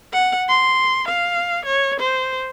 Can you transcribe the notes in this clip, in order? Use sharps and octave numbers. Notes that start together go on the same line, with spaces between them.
F#5
C6
F5
C#5
C5